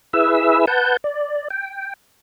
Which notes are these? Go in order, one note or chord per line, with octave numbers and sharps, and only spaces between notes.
E4 G#4 B4 E5 E6
B4 F#5 A5 G6
D5
G5